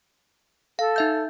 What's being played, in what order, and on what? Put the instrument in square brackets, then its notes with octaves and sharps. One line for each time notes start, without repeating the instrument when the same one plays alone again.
[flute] A4 [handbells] F5
[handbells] D#4 E5 G6